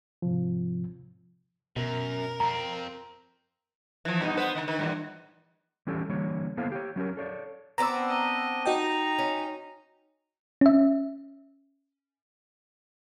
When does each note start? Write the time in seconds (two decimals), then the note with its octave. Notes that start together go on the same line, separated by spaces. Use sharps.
0.22 G#2 C3 F3
1.76 F#2 B2 A#4
2.40 F2 C4 A#5
4.05 E3 F3
4.20 G2 B2 D#4
4.37 B3 B4 C5
4.55 D3 D#3
4.67 D#3 B4
4.79 G2 A#2 E3
5.87 E3 G3 C#4 G4 A4
6.09 D3 E3 G3 A#3 C#5
6.57 A#3 B3 E4 A4 C5 F5
6.72 G4 C#5
6.96 F#3 C#4 G4 A#4
7.17 A4 C#5 D5
7.78 B3 C4 D4 A#5 E6
8.08 D#5
8.66 D#4 F#4 D#5 G5 A#5
9.19 C#4
10.61 C#4 E5